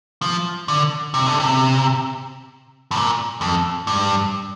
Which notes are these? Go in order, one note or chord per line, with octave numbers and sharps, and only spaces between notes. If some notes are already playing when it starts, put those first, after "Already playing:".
F3
D3
C3
D3
C3
G2
A#2
F2
G2